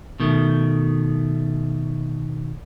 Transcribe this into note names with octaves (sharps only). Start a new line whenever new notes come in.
B2 D#3 A3